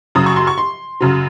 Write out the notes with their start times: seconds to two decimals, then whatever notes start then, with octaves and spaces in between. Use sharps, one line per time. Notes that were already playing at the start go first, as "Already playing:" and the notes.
0.15 F#2 C#3 F#3 D#6
0.26 C#6
0.36 C6
0.47 C#6
0.58 C6
1.00 F#2 C#3 F#3